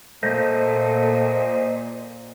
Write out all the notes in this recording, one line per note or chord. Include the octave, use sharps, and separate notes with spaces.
A#2 A3 C5 D#5